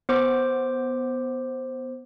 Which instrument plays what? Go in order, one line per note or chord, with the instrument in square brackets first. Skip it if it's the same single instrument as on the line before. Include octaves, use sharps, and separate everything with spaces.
[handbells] B3 C5 D6